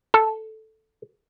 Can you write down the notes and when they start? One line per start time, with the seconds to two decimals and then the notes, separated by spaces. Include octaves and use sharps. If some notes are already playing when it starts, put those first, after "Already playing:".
0.14 A4